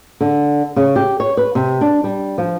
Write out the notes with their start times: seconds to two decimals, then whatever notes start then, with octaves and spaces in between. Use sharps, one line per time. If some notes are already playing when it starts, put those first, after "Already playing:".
0.21 D3
0.76 C#3
0.96 G4
1.20 C#5
1.37 B4
1.55 C3
1.81 D4
2.04 G3
2.38 F3